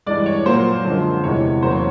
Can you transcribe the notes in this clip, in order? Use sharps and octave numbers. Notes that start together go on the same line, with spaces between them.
G2 E3 G#3 D5
C#5
A#2 F#3 A#3 C5
F#2 D3 F3 G#3
E2 C3 E3 G#3 C#5
E2 C#3 F#3 A#3 C5
C#5